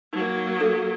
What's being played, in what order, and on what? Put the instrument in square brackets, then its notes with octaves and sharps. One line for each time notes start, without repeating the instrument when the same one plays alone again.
[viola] F#3 A#3 [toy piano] D#4
[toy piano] D4 A4